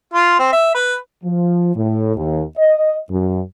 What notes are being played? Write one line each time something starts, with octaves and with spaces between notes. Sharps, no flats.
F4
C4
E5
B4
F3
A2
D#2
D#5
F#2